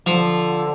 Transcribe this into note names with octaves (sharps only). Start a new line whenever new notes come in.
D3 F3